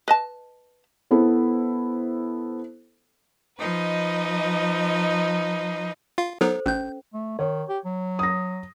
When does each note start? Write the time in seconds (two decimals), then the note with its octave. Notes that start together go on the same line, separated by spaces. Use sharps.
0.08 B4 D#5 A5
1.11 B3 E4 A4 C5
3.58 F3 D#4 B4 D#5
6.18 F4 F5
6.41 F#3 B3 D#4 A4 C5
6.66 A1 C#4 G6
7.14 A3
7.39 D#3 C#5
7.68 G4
7.85 F#3
8.19 D#6 A#6